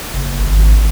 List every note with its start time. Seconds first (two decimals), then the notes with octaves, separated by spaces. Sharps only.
0.13 F#1
0.46 G#1